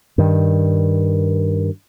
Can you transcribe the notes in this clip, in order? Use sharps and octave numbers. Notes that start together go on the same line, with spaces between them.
G2 D#3